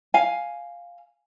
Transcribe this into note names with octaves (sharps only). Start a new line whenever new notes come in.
F5 G#5